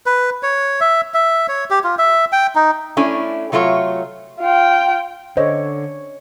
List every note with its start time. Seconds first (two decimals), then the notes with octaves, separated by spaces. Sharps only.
0.06 B4
0.43 C#5
0.81 E5
1.14 E5
1.48 C#5
1.70 G4
1.84 F4
1.99 E5
2.32 G5
2.55 D#4
2.97 A3 C#4 D4 E4
3.52 C3 F#3 A3 F4 C#5
4.40 F4 G5
5.37 D3 C5 C#5 D#5